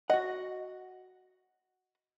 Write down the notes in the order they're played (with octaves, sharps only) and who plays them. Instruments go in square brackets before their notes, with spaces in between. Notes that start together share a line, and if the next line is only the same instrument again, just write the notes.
[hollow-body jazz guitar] F#4 F#5 [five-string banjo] D#5